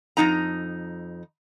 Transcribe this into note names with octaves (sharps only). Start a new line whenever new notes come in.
F2 A#2 D#4 A#5